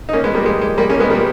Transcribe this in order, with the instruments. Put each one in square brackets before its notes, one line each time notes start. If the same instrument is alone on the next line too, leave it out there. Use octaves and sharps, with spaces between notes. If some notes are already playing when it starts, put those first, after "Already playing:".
[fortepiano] D#4
A#3 C#4
G#3 B3
G3 A#3
G#3
G#3
G3 A#3
A#3 C#4
G#3 B3
G3 A#3